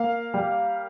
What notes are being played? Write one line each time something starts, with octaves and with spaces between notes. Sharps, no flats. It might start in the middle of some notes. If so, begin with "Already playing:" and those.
Already playing: A#3 F5
G3